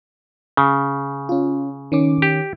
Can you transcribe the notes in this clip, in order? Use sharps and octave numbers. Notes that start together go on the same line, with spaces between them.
C#3
C#4 F4
D#3 C#4 D6
G4